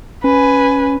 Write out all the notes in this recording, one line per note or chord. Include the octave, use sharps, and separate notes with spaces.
C#4 B4 G#5